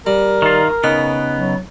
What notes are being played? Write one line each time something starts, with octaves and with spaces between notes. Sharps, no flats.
G3 A#4
D#3 F4
C#3 B3 D#4
F#3